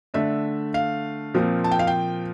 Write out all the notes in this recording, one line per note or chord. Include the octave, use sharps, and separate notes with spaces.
D3 A3 D4 E5
F5
A#2 F3 C4
A5
G5
F5
G5